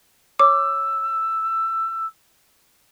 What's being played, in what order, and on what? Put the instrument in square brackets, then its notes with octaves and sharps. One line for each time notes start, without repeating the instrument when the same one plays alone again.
[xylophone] C#5 D6 [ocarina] E6